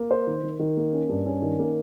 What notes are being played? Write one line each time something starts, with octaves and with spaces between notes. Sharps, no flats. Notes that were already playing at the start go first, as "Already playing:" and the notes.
Already playing: A#3
C5
D#3
D#3
D#3
A#3
C#4
G2
C#4
D#3
A#3